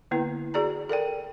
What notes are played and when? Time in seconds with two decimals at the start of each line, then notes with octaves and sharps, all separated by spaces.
0.11 D3 A#3 B3 E4 B4
0.54 F#4 G#4 D5 A#5
0.89 A4 A#4 D5 G5